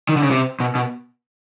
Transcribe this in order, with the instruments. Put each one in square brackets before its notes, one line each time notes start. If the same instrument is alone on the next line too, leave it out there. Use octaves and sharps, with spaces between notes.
[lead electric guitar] D#3
D3
C#3
C3
B2
B2